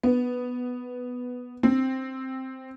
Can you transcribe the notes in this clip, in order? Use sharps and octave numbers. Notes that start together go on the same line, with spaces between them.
B3
C4